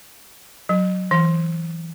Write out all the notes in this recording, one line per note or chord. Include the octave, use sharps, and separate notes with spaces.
F#3
E3